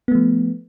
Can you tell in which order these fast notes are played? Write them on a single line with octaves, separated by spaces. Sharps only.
B3 A3 F3